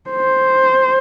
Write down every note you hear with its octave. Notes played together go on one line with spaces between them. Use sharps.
C5